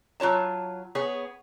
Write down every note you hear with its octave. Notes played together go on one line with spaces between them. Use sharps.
F#3 F4 C#5 A5
B3 G#4 C#5